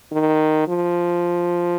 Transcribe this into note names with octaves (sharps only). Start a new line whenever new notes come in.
D#3
F3